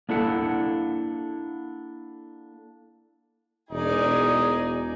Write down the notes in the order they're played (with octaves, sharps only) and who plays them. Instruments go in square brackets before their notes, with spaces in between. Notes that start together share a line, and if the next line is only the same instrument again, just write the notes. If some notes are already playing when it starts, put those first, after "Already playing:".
[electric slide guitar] A#3 D4 E4 A4 F#5
[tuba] E1 [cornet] D#4 [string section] G#4 D5 G#5